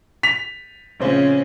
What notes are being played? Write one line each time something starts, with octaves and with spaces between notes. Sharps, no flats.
B6 F7
A#1 C#3 G#3 C4 C#4 C5